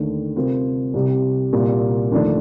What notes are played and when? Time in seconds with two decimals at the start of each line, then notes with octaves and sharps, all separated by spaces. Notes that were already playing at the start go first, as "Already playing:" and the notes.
Already playing: D#2 D3 A3
0.35 C3 G3 C4 F4 A#4
0.94 C2 C3 G3
1.53 C2 A#2 G3
2.11 D#2 D3 F3 A3 D4